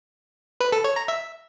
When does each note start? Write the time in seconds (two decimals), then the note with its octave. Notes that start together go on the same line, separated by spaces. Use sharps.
0.60 B4
0.72 A4
0.84 C#5
0.96 A#5
1.08 E5